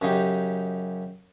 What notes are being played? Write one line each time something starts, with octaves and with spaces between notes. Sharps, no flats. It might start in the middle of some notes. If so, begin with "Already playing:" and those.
F#2 C#3 D#4 G4